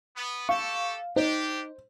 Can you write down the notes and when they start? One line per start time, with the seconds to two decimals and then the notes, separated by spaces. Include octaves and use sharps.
0.15 B3
0.49 G4 A4 F5 C#6
1.16 D4 D#4 G4 C5